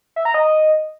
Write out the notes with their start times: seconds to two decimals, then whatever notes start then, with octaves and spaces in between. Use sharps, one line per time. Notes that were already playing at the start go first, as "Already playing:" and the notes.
0.16 E5
0.25 A#5
0.34 D#5